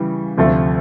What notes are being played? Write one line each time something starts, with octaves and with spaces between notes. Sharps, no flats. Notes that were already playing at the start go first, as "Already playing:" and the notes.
Already playing: C#3 E3 G3
D2 C3 F3 A3